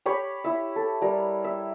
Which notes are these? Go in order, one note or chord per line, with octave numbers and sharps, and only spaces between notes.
G4 C#5 B5 C#6
E4 E5
A4
G3 A#4
E5